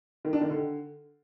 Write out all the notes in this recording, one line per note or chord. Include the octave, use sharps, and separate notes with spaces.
D#3
D4
D#3
D3